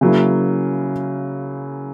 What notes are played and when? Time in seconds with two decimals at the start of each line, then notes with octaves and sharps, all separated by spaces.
0.01 C#3 F#3 A#3 E4